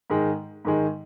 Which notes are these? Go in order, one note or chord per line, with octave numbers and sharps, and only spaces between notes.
G#2 D#3 G#3
G#2 D#3 G#3